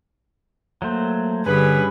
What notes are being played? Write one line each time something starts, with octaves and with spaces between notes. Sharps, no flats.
F#3 A3 A#3 C5
G2 D3 C#4 G#4 B4